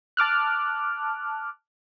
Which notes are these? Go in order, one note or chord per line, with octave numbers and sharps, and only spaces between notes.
A5 D6 F6 F#6